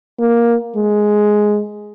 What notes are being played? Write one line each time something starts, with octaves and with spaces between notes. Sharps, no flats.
A#3
G#3